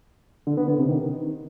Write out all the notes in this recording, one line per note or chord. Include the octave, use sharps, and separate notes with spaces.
D3
B3
D3
C3
D#3